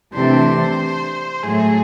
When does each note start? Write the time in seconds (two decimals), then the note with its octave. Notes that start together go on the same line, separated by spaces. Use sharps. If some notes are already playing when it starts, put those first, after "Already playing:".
0.13 C3 E3 A3 D4 C5
1.43 A2 F#3 A3 G#4